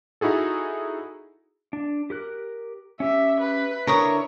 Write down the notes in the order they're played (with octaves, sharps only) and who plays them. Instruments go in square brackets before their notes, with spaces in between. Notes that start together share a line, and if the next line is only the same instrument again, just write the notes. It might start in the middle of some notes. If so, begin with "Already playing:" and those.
[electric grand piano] D#4 E4 F#4 G#4 A4
[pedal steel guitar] D4
G4 A#4 F#6
[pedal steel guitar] C#4 G4 [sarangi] E5
[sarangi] B4
[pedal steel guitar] D3 D4 E4 [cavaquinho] A#4 C#6 D#6 [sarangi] C#5